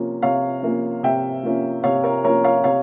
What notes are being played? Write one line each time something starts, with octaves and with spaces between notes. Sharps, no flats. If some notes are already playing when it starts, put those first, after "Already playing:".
Already playing: C3 F3 A#3 C#4
C3 C#5 F5
F3 A#3 C#4
C3 E5 G5
F3 A#3 C#4
C3 C#5 F5
A#4 C#5
F3 A#3 C#4 A#4 C#5
C#5 F5
C3 C#5 F5